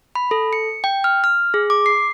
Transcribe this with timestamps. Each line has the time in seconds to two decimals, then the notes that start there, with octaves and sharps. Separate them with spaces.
0.15 B5
0.31 A4
0.53 C#7
0.84 G5
1.04 F6
1.24 F6
1.54 G#4
1.70 D6
1.86 C7